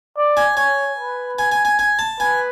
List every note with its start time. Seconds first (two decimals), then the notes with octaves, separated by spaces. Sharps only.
0.17 D5
0.37 G#5
0.57 C#5 G#5
0.98 B4
1.39 G#5
1.52 G#5
1.65 G#5
1.79 G#5
1.99 A5
2.20 B4 G#5